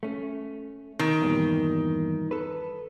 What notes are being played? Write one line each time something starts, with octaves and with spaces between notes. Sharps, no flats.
A3 C#4
D#3
E2 G2 A#2
A4 B4